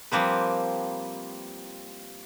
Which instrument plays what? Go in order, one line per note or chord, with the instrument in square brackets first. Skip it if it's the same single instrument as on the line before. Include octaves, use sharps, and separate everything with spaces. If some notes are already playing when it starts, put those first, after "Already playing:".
[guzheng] F3 G3 A#3 C4 B4